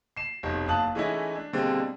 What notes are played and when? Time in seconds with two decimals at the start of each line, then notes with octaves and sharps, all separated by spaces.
0.17 C7 E7
0.43 F1 B1
0.68 F#1 F5 A5 D#6 F#6 F#7
0.95 E3 G#3 A3 C#4 D#4 E4
1.35 D4
1.53 B2 D3 G3 G#3 A#3 C4